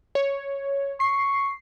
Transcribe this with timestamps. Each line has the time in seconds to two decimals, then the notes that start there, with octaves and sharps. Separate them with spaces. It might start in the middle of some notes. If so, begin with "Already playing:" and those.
0.15 C#5
1.00 C#6 C7